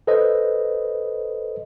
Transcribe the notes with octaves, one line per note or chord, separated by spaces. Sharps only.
A4 B4 C5 D#5